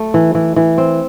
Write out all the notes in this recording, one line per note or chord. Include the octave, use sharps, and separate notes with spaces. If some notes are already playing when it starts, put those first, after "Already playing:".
Already playing: A3
E3
E3
E3
C4